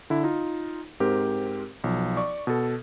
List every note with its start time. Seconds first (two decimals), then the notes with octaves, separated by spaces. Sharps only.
0.10 D3 E4
0.24 D#4 F4
1.00 G#2 C4 G4 A#4
1.84 B1 F3
2.17 D5 C#6
2.47 B2 A4